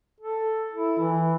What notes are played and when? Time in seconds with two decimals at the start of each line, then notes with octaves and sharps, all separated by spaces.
0.20 A4
0.74 E4
0.99 E3